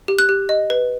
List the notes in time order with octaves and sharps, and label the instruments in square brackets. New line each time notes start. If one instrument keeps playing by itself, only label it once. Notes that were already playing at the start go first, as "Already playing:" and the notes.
[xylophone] G4
F#6
G4
D#5
B4